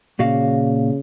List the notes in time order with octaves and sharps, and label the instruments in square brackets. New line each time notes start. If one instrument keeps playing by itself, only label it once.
[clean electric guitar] A#2 F#4 F5 [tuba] C#3